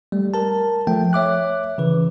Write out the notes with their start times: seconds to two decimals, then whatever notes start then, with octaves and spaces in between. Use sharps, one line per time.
0.12 G3 A3
0.34 A#4 A5
0.87 F3 A3 G5
1.13 C#5 E5 D6 F#6
1.78 C#3 E3 B4